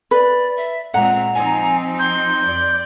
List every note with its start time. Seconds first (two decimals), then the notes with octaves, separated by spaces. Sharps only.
0.11 B4 D5
0.56 E5
0.94 A#2 G#3 C4 F#5 A#5
1.35 F3 C4 D#4 G#5
1.99 C6 G6
2.45 F2 D5